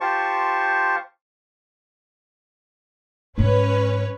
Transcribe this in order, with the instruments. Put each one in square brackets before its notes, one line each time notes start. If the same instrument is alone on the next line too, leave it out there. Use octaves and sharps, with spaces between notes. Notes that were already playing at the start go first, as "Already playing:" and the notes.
[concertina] F4 G4 C5 A5 C#6
[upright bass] G#2 G3 [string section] C#4 B4 C#5